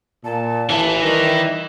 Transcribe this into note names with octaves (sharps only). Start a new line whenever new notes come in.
A#2 A5
A1 E3 E4
D#3 G3 A#6